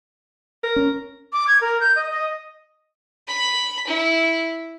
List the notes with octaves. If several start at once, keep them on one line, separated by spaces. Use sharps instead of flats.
A#4
C#4
D6
G#6
A#4
G6
D#5
D#5
B5
E4